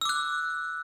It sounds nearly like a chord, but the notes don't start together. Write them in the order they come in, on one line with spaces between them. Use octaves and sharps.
E6 D6 F#6